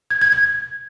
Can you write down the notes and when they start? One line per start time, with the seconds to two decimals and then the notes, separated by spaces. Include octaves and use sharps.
0.10 G#6
0.22 G#6
0.33 G#6